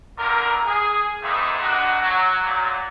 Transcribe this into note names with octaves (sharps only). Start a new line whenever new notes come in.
E2 G2 D3 A#4
G#4
G#2 A3 A#3 C4 D#4 E4
D3 D4 D#4 F#4
F#3
A#2 F#3